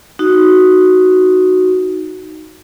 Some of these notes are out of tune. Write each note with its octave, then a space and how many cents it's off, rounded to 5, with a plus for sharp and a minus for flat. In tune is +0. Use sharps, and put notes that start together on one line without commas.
D#4 +0 F#4 +0